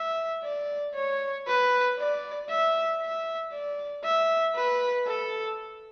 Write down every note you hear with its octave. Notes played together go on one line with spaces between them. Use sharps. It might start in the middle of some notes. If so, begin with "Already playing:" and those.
Already playing: E5
D5
C#5
B4
D5
E5
E5
D5
E5
B4
A4